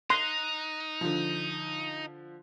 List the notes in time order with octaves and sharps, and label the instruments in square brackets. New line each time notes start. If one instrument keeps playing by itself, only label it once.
[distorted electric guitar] D#4 [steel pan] C6 [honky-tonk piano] F#6 A#6 D#7
[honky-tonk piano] D3 F3